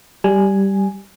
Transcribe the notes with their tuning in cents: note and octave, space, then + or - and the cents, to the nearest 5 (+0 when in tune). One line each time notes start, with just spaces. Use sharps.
G3 -5 G#5 +0